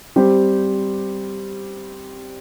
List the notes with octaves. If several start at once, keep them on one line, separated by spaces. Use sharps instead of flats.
G3 C4 G4 C5